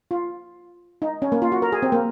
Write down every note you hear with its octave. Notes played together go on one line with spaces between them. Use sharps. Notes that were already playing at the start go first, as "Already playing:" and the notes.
F4
D#4
C#4
A#3
F4
F#4
A#4
G#4
C4
A#3